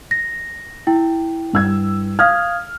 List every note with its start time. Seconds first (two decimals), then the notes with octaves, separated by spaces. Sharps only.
0.11 A#6
0.87 E4 G5
1.53 G2 E6 G#6
2.19 F5 D#6 F6 G#6